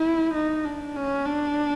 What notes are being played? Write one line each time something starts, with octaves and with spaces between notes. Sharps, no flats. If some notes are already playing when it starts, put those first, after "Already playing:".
Already playing: E4
D#4
D4
C#4
D4